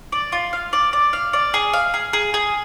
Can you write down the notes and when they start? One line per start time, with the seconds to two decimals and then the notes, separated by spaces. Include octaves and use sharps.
0.12 D5
0.32 F4
0.53 F5
0.73 D5
0.93 D5
1.13 F5
1.33 D5
1.54 G#4
1.73 F5
1.94 G#4
2.13 G#4
2.34 G#4